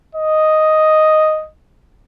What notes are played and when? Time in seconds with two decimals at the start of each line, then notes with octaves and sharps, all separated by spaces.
0.16 D#5